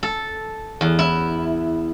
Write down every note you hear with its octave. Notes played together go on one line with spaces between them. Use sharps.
A4
E2
E4